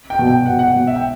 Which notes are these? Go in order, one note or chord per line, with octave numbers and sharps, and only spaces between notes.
G5
B2
G5
B2 F#5
F#5
B2
E5
G5